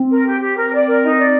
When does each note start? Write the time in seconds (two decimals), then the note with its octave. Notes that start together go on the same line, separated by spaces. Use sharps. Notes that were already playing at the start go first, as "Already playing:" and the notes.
Already playing: C4
0.09 A#4
0.25 G4
0.41 G4
0.56 A#4
0.72 D5
0.88 A#4
1.02 D#4
1.18 D5